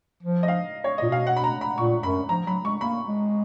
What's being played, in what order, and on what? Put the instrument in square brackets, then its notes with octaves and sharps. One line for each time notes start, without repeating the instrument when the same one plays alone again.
[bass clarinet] F3
[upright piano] D#5
F5
C#5
[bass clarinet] A#2 [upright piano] D#5
[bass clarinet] B2 [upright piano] F5
[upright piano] F#5
B5
A#5
B5
[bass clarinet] A#2 [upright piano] C#6
[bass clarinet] F#2 [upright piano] B5
[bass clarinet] F3 [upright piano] A#5
[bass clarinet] F#3 [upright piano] B5
[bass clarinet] G#3 [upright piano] C#6
[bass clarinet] A#3 [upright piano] B5
[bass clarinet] G#3